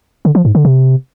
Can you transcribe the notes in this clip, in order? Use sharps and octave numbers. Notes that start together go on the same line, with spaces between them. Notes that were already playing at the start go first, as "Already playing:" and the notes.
D3
F3
G#2
D3
C3